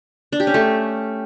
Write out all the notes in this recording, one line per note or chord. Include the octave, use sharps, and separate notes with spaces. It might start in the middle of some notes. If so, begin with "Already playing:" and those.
D4
G4
C#4
A3